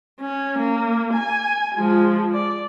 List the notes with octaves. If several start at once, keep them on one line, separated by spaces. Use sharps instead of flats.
C#4
A#3
G#5
F3 G#3
D5